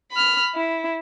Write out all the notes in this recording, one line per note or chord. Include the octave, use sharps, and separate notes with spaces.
B5 F6
E4